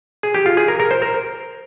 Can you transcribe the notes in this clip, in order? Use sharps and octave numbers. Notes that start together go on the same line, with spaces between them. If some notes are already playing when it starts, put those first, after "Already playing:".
G#4
G4
F4
G#4
A#4
A#4
C5
A#4